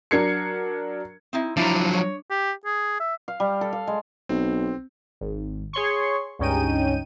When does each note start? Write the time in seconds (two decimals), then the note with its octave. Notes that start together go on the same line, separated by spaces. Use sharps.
0.11 F#3 D4 A#4 G#6 C7 C#7
1.33 C4 D#4 E4
1.57 F3 F#3 D4 E4
1.93 C#5
2.31 G4
2.66 G#4
3.00 E5
3.28 F5
3.40 G3
3.61 A4
3.73 F5
3.87 G#3
4.29 B1 C4
5.21 G#1
5.73 G#4 C#5 C6 C#6
6.39 C#2 G2 C#4 D#4 G5 D#7